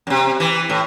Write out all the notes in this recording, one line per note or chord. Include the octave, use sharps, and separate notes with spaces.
F#2 C3
E3
A2